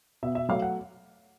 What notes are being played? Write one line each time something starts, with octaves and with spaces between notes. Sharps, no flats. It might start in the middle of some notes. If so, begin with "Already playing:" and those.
B2 E5
E5
F#3 A3 F5
F#5